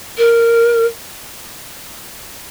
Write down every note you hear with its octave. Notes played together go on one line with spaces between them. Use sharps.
A#4